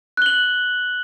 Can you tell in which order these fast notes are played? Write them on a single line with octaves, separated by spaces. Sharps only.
F#6 G7 F#7